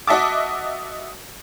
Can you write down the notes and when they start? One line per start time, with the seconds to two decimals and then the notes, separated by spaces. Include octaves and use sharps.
0.07 F#4 D#5 E5 A5 D6